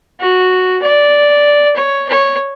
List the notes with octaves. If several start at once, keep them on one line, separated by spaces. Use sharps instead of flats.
F#4
D5
C#5
C#5